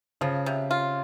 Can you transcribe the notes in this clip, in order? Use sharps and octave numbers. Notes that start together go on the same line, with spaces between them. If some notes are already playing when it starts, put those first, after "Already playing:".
C#3 F3
C3
F4